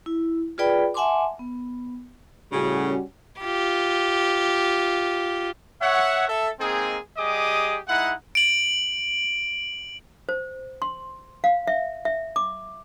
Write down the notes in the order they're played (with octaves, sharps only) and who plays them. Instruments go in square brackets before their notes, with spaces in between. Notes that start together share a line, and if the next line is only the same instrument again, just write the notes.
[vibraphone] E4
F4 G#4 B4 D5 G5 B5
E5 F#5 G#5 A5 C6 D6
B3
[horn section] A2 C#3 [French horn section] G3 C#4 F#4
[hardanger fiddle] F4 G4
[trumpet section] C#5 E5 F#5
A4 E5
G#3 A#3 C4 D#4 G#4
G3 G4 G#4 D#5 D6 D#6
G#3 D#4 E4 F#5
[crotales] D7 F#7
[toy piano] C5
C6
F5
E5
E5
D6